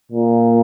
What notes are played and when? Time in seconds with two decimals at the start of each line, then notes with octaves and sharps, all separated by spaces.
0.12 A#2